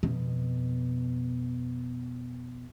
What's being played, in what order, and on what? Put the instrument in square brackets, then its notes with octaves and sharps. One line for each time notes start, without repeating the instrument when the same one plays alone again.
[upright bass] F2 B2